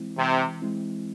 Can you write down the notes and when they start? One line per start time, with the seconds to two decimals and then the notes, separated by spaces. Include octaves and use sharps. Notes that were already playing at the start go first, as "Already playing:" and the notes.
Already playing: E3 G#3 C4 E4
0.17 C3 E3
0.62 G#3 C4 E4